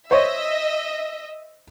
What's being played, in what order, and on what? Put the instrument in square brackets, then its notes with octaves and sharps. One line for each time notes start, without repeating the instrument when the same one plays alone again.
[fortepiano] C5 C#5 [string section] D#5 E5